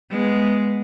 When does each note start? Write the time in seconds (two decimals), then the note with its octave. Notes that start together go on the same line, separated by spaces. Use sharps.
0.11 G#3 B3